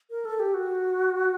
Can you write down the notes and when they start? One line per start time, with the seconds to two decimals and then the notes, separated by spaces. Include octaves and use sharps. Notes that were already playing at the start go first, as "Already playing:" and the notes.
0.10 A#4
0.25 A4
0.39 G4
0.54 F#4